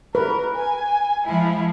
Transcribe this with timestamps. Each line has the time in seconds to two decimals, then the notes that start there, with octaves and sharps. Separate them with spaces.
0.15 A#4 B4
0.55 G#5
1.24 F3 G#3 E4